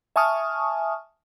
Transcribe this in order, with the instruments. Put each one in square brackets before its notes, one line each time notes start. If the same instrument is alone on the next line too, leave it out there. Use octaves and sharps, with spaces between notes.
[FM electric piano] E5 G#5 A5 C#6 D#6 F6